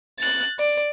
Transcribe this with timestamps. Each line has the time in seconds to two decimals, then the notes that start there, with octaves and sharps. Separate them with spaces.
0.20 F#6 A6
0.59 D5